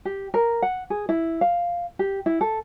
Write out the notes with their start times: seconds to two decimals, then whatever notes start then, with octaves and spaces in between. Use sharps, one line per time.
0.05 G4
0.34 A#4
0.62 F#5
0.90 G#4
1.09 E4
1.41 F5
1.99 G4
2.26 E4
2.41 A4